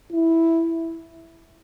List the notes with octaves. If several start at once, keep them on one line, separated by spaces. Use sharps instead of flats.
E4